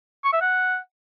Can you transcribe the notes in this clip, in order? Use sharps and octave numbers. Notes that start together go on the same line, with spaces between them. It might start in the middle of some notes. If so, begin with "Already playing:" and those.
C#6
E5
F#5